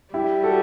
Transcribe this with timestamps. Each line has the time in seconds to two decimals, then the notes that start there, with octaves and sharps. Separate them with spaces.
0.14 G3 E4 G4
0.43 F#4 A4